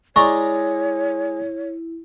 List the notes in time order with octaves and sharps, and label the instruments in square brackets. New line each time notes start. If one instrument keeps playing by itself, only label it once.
[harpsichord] G#3 D5 A#5 [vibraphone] E4 [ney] C#5 [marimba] C#6